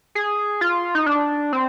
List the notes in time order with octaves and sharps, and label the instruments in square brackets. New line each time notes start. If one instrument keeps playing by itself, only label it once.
[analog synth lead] G#4
F4
D#4
D4
C4